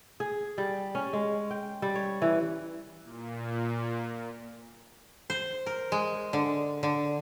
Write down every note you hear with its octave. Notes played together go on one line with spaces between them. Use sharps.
G#4
G3
C#4
G#3
G5
G3
C#5
E3
A#2
C5
A#4
G#3
D3
D3